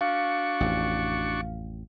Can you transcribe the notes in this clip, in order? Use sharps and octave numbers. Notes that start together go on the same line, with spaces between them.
D4 F#4 F5 C#6
A1 F2